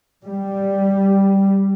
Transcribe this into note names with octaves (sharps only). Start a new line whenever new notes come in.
G3